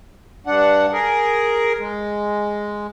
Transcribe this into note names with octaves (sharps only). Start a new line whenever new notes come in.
G2 D4 F#5
G#4 A#4
G#3